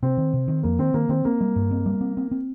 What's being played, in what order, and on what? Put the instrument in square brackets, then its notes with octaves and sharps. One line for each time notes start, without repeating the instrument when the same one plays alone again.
[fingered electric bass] C3 [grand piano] C4
[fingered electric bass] D#3
C3
D#3
[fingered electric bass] F2 [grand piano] A#3
[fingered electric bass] D#3 [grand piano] C4
[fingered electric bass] D#3 [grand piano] A#3
[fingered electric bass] D#3 [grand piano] C4
[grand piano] A#3 [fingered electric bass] C4
[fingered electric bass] G3
G2
C4
G3
C4
C4
C4